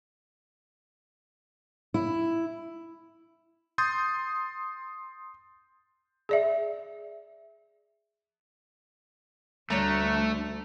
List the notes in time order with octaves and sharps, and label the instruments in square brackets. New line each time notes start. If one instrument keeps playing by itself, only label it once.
[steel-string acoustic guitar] E4
[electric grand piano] C6 D#6 G6 A6
[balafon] G#4 D5 E5
[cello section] D2 [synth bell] G3 F7 [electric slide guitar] A3 [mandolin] D4 C#5 A#5